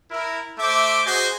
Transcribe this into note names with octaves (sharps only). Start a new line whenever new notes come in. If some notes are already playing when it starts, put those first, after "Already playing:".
E4 A#4
A3 C5 E5 D6
F#4 G#4 C5 D#5 G#5